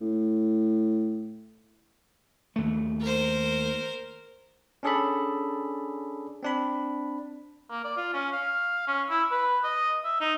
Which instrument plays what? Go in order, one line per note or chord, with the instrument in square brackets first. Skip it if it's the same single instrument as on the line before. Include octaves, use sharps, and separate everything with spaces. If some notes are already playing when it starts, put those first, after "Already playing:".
[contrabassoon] A2
[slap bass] D#2 A3
[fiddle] A#4 C5
[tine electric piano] C#4 D4 G#4 A4 D5 B5
C4 D4 B5
[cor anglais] A#3
D5
F4
C#4
F5
C#4
E4
B4
D#5
E5
D#4